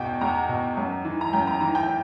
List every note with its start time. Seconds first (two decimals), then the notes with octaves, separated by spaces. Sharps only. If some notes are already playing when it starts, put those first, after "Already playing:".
Already playing: E2 B2 G5
0.21 E2 A#5
0.49 B2
0.77 F#2
1.05 E3
1.21 A#5
1.33 F#2 G5
1.47 A#5
1.61 E3 A#5
1.75 G5